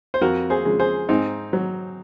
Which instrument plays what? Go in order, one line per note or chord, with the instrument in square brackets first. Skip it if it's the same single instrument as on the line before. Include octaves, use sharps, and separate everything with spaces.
[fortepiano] C5
F2 F#4 A#4
G#4 C5
C#3 F3 G#3
G#4 C5
G#2 C4 D#4
F#3